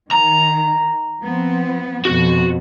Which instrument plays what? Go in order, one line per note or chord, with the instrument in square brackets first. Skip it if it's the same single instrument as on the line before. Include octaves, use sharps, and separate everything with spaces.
[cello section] D#3 [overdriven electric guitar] A#5
[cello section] F3 B3 C4
[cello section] F2 B2 [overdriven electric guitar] F#4